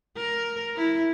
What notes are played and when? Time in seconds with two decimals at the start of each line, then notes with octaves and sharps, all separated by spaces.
0.17 A#4
0.77 E4